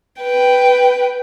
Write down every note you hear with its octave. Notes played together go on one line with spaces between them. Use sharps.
B4 G5